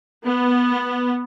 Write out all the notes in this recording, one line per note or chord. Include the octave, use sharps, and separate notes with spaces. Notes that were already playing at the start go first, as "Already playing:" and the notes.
B3